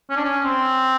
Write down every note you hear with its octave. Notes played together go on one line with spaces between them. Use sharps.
C#4
D4
C#4
C4